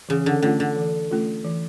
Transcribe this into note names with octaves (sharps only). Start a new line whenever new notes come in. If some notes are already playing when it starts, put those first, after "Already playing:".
C#3 E3
D3
D3 A3 C#4 F4 A4
D3
E3
A3 C#4 F4 A4
E3